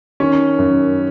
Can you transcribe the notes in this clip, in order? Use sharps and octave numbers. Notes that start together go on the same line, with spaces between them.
D#3 C#4
F#2